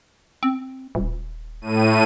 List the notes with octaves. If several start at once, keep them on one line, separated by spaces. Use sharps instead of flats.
C4
D#1
A2 D#7